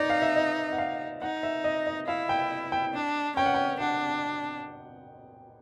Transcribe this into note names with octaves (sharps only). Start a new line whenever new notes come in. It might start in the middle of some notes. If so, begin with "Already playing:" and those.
Already playing: D#4 D5
F5
E5
D#5
F#5
F5
D#4 F#5
E5
D#5
D#5
E4 F5
G5
G5
D4
C#4 G5
F#5
G5
D4 F#5